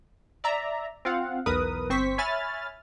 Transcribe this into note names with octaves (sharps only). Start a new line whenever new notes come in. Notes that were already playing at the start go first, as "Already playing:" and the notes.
D5 E5 A#5
C4 F4 F5 F#5
B1 E2 A#4 B4 D#6
G1 C4 C5 C#6 B6
C#5 E5 G#5 B5 F6 A6